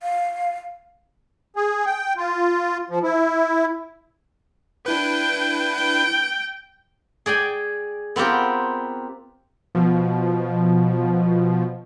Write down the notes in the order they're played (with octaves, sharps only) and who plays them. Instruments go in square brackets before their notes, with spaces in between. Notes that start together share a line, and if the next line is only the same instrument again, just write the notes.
[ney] F5
[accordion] G#4
G5
F4
F3
E4
[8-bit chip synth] D4 E4 B4 [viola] G5
[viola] G5
[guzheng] G#4 D5 G5 G#5
B3 C4 F4 G4 A#4
[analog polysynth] B2 F3